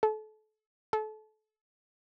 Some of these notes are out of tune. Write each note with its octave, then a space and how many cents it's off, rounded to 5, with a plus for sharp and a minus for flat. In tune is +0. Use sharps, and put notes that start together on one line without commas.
A4 -30
A4 -30